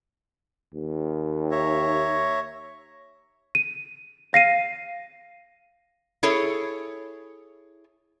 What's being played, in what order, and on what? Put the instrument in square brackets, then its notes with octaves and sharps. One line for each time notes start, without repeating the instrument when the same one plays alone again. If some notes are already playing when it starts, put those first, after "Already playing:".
[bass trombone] D#2
[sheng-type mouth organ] C#5 E5 A#5
[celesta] D#7
[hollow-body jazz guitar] F5 [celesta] A#6 C7 D#7
[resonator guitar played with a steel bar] E4 G#4 A4 C#5